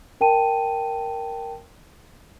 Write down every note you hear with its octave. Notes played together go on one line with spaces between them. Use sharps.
A#4 G5 A5 D#7